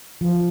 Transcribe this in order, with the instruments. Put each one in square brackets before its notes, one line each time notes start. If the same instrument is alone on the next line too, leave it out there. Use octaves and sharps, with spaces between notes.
[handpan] F3